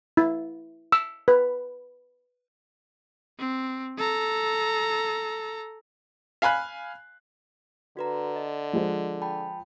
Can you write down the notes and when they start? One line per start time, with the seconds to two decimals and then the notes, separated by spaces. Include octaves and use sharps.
0.17 E4
0.92 E6
1.28 B4
3.39 C4
3.98 A4 A#5
6.42 F5 G#5 B5 F#6
7.97 D3 F#4 B4 A#5
8.36 D#5
8.73 F3 G#3 C5
9.22 G5 A5 B5